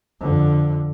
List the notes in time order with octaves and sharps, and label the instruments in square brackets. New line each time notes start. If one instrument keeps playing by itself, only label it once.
[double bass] F2 D3